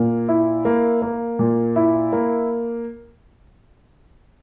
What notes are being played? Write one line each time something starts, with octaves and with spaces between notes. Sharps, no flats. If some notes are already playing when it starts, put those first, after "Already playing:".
Already playing: A#2 A#3
E4
A#3
A#3
A#2
E4
A#3